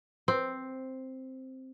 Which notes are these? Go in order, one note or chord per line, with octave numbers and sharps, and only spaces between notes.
C4